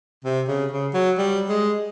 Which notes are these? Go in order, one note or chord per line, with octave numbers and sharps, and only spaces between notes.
C3
C#3
C#3
F#3
G3
G#3